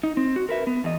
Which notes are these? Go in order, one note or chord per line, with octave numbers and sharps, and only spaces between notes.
D#4
C4
F#4
A#4 B4 E5
B3
E2 D#5